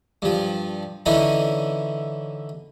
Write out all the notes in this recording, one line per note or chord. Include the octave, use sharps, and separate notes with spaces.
G2 F3
D3 E3 C#4 D#4 E4